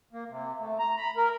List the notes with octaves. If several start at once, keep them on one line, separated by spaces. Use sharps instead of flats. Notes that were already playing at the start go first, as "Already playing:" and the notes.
A#3
C3
A3
A#5
B5
A#4